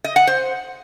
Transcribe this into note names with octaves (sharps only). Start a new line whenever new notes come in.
D#5
F#5
C5